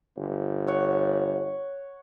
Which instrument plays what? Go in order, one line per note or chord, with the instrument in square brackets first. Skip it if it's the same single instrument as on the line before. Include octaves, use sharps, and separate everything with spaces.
[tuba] G1
[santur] C#5 F#5